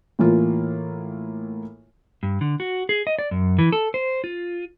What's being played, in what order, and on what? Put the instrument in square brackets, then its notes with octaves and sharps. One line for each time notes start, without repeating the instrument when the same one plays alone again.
[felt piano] A2 E3 A#3 F4
[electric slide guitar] G2
D3
F#4
G#4
D#5
D5
F#2
E3
A4
C5
F4